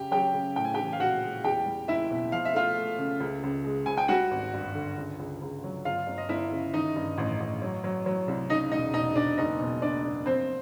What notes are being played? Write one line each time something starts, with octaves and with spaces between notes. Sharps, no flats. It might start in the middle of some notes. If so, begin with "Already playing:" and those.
Already playing: F#2 C#3 G4
F#3 G4 G5
C#3
A2 G5
G#5
G4 G5
E3
F5
A#1 F#4 F#5
G#3
E2 G4 G5
G3
F#1 E4 E5
B2
F3 F5
E5
A3 F4 F5
A3
C#3
C#2
C#2
G#3
C#2 G#5
G5
G3 F#4 F#5
G#1
G2
D3
C#2
C#2
C#2
F#3
G1 F4 F5
G1
D#5
G1 E4 E5
C#3
D#3 D#4 D#5
G2
A1
A1
F#3
F#3
F#3
C2
C#3 D#4 D#5
E1 D#4 D#5
E1 D#4 D#5
E1 D4 D5
F#1 D#4 D#5
B2
F#1 D4 D5
F#1
F3 C4 C5